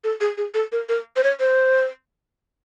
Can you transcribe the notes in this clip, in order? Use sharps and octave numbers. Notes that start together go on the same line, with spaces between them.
A4
G#4
G#4
A4
A#4
A#4
C5
C#5
C5